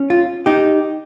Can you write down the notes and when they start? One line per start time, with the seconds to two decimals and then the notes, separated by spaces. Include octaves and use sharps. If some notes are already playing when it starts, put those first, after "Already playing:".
Already playing: C#4
0.10 F4
0.46 D#4 G4